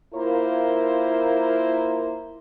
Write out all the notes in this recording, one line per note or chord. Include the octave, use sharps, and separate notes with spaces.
A#3 E4 F4 A#4 C5